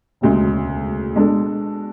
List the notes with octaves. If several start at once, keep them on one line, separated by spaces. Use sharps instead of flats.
E1 D2 C#3 G#3
B2 G#3 D4 A4